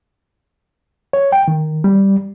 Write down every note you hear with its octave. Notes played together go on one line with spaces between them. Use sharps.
C#5
G5
D#3
G3